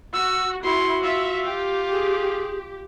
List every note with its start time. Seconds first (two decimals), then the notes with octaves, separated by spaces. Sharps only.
0.14 F#4 E6
0.64 E4 F#4 C6
1.04 F4 E5
1.45 G4
1.92 G#4